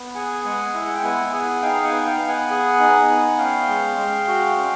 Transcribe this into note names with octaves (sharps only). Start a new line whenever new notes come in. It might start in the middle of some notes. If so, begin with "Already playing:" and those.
Already playing: B3
G#4 F#5 G#5
G#3 F#5 G#5
E4
F#5
G5
B3 F#5 G#5
G#4 F#5 G#5
D#4 F5 G5
F#5 G#5
B3
F5 G5
B3
F#5 G#5
G#4
D#4
B3
C#4 F5 G5
G#3
G#3
F#4
C#4